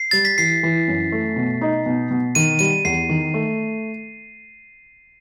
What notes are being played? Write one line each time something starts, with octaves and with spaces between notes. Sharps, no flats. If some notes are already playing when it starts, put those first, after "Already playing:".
Already playing: C7
G3 A6
B6
E3 C7
E3
F#2
A3
B2
D#4
B2
B2
D#3 D#7
G3 D#7
E2 C7
D#3
A3